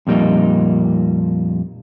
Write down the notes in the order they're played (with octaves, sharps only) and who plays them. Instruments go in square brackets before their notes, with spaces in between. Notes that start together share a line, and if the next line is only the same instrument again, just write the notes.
[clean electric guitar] F2 A#2 G3 A#3 D#4